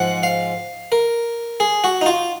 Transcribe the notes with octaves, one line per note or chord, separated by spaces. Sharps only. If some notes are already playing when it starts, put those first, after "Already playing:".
Already playing: G#2 F3 G#3 F#5
F5
A#4
G#4
F#4
D#4
F4